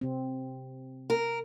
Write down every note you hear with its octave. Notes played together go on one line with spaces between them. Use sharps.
C3 C4
A#4